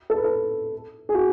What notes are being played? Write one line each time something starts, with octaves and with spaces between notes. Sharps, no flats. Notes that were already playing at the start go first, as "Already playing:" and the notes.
A4
B4
A4
G#4
F#4